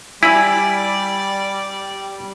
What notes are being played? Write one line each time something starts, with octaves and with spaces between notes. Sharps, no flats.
G3 E4 D5 G#5 B5 E6